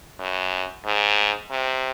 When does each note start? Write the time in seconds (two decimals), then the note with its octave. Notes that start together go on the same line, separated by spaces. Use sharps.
0.20 F#2
0.85 G#2
1.51 C3